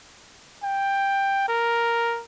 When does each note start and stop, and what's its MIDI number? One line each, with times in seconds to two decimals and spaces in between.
0.63 1.47 79
1.48 2.22 70